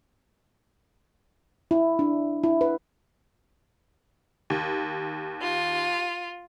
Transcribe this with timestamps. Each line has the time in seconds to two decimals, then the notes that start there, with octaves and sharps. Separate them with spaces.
1.71 E4
1.99 D4
2.43 E4
2.61 B4
4.50 D#2
5.40 F4